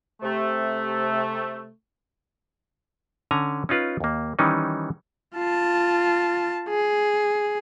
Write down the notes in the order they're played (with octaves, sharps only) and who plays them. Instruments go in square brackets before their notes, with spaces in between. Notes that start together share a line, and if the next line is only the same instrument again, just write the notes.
[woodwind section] C3 A3
[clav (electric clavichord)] D3 C#4 G#5 A#5
C#4 D#4 F4 B4
D#2 A#3
D#3 E3 G3 C#4 D#4
[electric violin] F4 A5
G#4